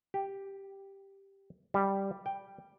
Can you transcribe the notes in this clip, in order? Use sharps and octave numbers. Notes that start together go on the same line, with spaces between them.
G4
G3
G5